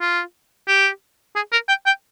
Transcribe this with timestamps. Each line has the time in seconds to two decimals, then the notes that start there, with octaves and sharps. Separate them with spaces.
0.01 F4
0.68 G4
1.36 G#4
1.53 A#4
1.69 G5
1.87 G5